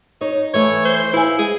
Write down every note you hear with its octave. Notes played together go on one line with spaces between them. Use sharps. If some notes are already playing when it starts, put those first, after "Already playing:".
D#4 C#5
E3 A3 A4 C#5
C5
E4 B4 F5 G#5
G#3 G#4